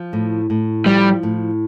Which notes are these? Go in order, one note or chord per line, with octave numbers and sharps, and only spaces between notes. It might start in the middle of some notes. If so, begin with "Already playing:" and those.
Already playing: F3
A2
A2
F3 G3
A2